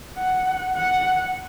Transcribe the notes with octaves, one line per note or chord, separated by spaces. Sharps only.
F#5
F#5